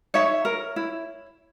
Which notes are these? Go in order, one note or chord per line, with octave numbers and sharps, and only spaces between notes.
D#4 C#5 E5
A#4
E4